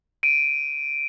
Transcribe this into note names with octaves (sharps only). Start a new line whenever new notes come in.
D7 D#7